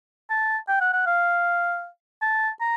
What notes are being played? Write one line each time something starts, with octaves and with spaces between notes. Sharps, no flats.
A5
G5
F#5
F#5
F5
A5
A#5